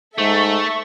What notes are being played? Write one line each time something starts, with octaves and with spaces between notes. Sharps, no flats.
G#2 A3 A4 E5 C#6